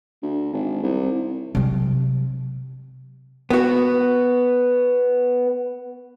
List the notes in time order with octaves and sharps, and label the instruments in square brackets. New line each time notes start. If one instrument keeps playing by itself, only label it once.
[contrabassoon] D2
G#1
C2
[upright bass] C3 F#3
[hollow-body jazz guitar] B3 F#4